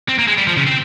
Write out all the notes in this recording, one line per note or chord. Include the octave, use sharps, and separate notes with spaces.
C4
A#3
G#3
G3
F3
C#3
C4